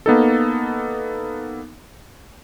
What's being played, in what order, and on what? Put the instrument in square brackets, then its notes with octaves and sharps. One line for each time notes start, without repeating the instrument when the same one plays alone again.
[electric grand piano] A#3 B3 D#4 A4